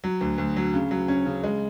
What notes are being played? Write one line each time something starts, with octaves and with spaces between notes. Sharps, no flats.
F#3
D2
D2
F#3
C#3
F#3
C#4
C#3
G#3